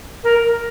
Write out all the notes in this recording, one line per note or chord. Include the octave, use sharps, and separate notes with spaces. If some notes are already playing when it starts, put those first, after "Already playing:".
A#4